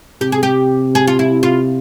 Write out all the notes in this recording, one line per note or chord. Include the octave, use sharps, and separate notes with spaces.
C3 G4
G#4
G4
G#4
F4
E4
F4